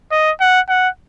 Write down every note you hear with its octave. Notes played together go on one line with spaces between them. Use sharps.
D#5
F#5
F#5